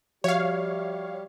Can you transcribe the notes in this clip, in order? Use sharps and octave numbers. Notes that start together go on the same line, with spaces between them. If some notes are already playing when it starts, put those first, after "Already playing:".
F3 G3 F#4 G4 C#5 E5 F5